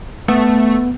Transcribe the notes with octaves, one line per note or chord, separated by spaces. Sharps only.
A3 B3